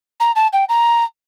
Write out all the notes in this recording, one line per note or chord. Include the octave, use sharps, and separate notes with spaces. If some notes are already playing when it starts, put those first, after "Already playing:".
A#5
A5
G5
A#5